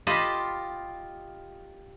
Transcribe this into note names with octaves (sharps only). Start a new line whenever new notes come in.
F4 G4 D#5 A5 B5